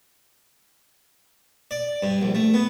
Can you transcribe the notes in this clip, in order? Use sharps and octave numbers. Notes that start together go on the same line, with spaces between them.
D5
G2
A#1
A3
B3